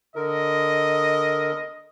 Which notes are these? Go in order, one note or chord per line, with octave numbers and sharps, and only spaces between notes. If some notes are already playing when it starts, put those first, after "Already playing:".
D3 A#4 D#5